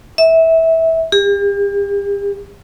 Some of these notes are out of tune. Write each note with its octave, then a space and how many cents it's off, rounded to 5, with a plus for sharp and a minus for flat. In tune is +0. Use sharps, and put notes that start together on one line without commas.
E5 -20
G4 +40